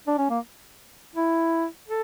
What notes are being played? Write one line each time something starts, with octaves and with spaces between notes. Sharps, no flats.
D4
C#4
A#3
E4
A4